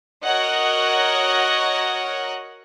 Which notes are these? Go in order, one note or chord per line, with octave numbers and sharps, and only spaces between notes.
F#4 A#4 C#5 D#5 F#5